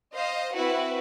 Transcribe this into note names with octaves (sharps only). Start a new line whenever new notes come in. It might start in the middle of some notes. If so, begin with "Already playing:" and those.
C5 D#5 F5
C4 E4 F#4 B4